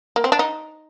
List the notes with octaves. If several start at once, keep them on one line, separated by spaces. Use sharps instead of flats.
A#3
C4
D4
D#4